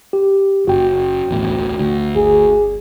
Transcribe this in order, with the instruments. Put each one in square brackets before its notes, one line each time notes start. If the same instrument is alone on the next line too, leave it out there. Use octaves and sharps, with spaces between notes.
[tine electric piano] G4
[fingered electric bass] F#1 [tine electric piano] F#4 G5
[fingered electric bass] D1 A1 E2
D2
[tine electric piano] G1 [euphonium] G#4